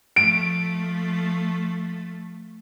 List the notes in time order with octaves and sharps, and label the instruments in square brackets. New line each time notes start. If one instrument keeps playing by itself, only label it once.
[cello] F3 A3 [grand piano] D7